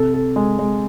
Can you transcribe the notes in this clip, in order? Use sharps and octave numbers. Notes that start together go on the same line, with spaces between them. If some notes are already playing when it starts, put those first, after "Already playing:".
Already playing: C3 A4
A4
G#3
G#3